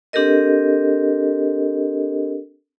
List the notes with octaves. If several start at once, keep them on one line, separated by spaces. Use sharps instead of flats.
C4 D4 G4 A4 A#4 D#5